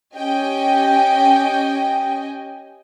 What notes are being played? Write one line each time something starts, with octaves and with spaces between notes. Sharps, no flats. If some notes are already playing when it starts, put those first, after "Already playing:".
C#4 G4 D#5 G5 G#5